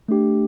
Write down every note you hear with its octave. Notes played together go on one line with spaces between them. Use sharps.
A3 D4 G4